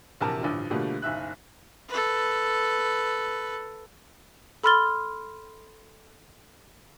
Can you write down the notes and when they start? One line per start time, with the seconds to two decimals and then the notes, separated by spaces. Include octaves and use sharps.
0.21 A#1 E2 C3 A#4 A5
0.41 A1 G2 D3 F3
0.70 B2 D3 F3 G3 A3 A#3
1.02 F#1 B1 E5 F#6
1.89 A4 B4
4.64 A4 B5 C6 F6 A6 G7